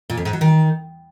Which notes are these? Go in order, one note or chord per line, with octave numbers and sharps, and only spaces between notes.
A#2
F2
G#2
F#3
D#3